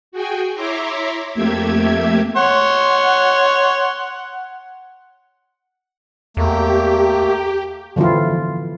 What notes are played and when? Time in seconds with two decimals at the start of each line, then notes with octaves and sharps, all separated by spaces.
0.12 F#4 G#4 G5 G#5
0.55 E4 C#5 E5 A#5 C6 D6
1.33 F2 A3 A#3 G4 E5 G#6
2.37 C#5 F#5 C6
6.37 E2 A3 A#3 G4
7.96 D3 E3 F3 E4 F4